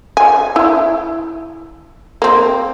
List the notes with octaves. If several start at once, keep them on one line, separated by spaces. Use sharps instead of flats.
G#5
E4
A#3 C4